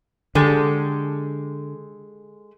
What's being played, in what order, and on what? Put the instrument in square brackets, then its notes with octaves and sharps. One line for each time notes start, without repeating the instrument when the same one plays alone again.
[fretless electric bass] D3 [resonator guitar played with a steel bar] G#3 G4 A4